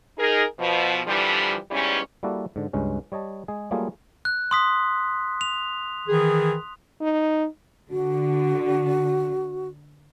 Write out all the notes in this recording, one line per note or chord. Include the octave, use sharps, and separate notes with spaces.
D#4 G#4 A#4
B2 F3
D3 E3 F3 G3
E2 G#2 E3 G3 C#4
G3 A#3 E4 F#4 A4 D5
G#2 D3
C#2 G2 G#3 C#4
G3 C#5 D#5 A5
G#3 G#4
F#3 G3 A3 A#3 F4 G#4
F#6
C6 D#6 B6
F7
D#3 E3 G#4
D#4
D3 F#4